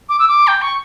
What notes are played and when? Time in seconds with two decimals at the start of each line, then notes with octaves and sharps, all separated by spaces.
0.09 D6
0.19 E6
0.28 D6
0.47 G5
0.62 C#6